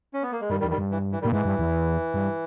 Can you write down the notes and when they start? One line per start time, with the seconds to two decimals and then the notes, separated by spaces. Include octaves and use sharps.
0.14 C#4
0.22 B3
0.31 A#3
0.41 G#3
0.49 G2 D#3 G3
0.60 D#3 G3
0.64 E2
0.70 D#3 G3
0.78 G2
0.91 E3
1.12 E3
1.22 D#3 G3
1.25 A#2
1.32 G#2 E3
1.45 G2
1.59 E2
2.14 G2